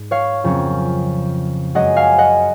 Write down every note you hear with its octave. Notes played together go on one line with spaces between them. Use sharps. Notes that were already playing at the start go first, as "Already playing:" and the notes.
Already playing: G#2
C#5 F5
F2 C#3 F#3 A#3 C#4
F#2 C#3 G#3 C#4 D#5 F#5
F5 G#5
D#5 F#5